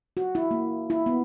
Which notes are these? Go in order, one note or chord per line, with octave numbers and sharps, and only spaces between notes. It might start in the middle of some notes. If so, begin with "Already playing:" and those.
F#4
E4
A#3
E4
B3